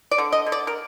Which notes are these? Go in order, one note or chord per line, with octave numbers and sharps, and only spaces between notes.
D5
D3
D#5
D3
D5
A#4